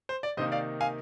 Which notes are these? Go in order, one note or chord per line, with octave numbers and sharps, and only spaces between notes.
C5
D5
C3 D#3 A#3 D#4 C5 D#5
D5 F5
F5 G#5